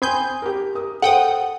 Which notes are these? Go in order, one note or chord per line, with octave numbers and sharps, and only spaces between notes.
C4 G#5 B5 C6 D#6 G6
G4 A#4
A#4 D#6
A4 C5 F#5 G5 D#6